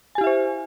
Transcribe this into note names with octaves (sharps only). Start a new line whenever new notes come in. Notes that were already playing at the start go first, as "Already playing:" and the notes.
E4 G4 C5 E5 G#5